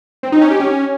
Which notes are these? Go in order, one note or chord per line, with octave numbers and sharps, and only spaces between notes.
C4
D#4
C#4
G4
C#4